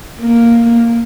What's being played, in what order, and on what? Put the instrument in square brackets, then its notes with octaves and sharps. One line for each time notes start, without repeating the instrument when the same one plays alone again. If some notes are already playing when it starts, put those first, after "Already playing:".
[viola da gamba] A#3